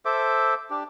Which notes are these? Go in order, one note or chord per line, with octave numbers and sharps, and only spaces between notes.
A4 C5 E5 D6
D4 G4